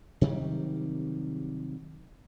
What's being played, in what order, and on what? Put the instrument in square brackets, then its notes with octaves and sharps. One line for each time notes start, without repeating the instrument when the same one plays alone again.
[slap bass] C3 D#3 F#3 G3